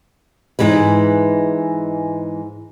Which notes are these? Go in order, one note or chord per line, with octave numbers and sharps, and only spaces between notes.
G#2 C3 E3 G#3 B4